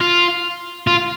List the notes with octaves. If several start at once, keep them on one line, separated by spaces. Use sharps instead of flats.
F4
F4